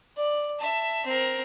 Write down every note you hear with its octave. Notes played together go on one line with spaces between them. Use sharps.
D5
E5 A5
C4 A#4